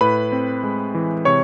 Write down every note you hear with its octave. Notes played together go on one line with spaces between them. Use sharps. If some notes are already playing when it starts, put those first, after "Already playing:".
A2 B4 B5
C4
G#3
E3
C3 C#5 C#6